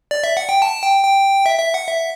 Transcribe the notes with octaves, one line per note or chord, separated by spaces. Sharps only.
D5
E5
F#5
G5
A5
G5
G5
E5
E5
F#5
E5